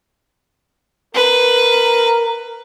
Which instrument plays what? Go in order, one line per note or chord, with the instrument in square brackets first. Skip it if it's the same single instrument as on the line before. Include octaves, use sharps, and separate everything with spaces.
[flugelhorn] A#4 [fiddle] B4